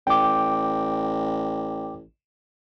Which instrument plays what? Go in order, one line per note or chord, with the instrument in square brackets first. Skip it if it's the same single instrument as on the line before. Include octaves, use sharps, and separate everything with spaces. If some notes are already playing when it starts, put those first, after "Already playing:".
[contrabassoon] A1 [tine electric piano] G5 D6